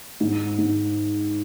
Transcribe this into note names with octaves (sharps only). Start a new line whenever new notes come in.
G#2
G#2